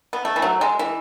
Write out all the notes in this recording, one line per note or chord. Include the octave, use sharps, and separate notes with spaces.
B3
A3
E3
F#3
G#3
E3